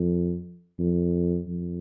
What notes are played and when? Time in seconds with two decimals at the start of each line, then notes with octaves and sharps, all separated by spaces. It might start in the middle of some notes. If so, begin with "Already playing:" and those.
Already playing: F2
0.79 F2
1.48 F2